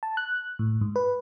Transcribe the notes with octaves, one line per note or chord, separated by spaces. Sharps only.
A5
F#6
A2
G#2
B4